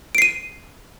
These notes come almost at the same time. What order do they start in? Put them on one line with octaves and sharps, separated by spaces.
D7 C7 D#7